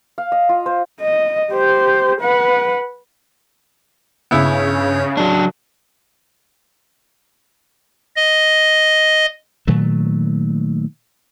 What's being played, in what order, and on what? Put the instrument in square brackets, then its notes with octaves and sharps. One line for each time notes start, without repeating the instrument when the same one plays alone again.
[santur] F5
D#5
F4
C5
[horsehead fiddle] D#5
G4 C5
B4 F#5
[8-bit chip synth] G2 C#5 G6 [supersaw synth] C#3 [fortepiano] B3 E4
[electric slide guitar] F#3 D4
[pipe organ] D#5
[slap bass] A#2 D#3 F#3 A3